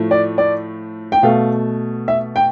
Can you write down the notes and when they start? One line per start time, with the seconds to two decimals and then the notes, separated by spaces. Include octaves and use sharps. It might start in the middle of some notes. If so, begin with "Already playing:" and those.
Already playing: A2 F3 A3
0.11 D5
0.38 D5
1.12 G5
1.23 B2 A3 F5
2.08 E5
2.36 G5